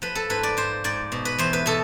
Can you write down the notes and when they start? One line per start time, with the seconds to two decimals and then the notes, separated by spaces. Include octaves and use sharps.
0.02 F3 B4
0.15 A4
0.30 G#2 B4
0.43 D5
0.57 G#2 C5
0.84 G#2 D5
1.12 B2
1.25 B4
1.38 E2 C5
1.53 B4
1.66 B2 A4